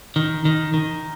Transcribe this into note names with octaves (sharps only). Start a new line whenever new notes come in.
D#3
D#3
D#3